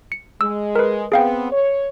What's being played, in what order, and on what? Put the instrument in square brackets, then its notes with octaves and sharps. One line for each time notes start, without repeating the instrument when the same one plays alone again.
[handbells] C#7
[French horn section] G#3 [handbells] E6
[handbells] A#4 B4
[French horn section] B3 C4 [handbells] G#4 F5 G5
[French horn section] C#5